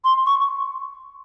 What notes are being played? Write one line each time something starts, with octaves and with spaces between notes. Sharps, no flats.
C6
C#6